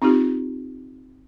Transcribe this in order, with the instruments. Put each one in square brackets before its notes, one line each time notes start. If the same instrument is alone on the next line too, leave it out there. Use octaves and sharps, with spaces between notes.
[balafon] C4 D#4 F4 G4